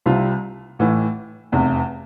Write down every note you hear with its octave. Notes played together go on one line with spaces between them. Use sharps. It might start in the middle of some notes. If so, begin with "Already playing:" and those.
C2 C3 G3 C4 F4
A1 A2 E3
F1 E2 C3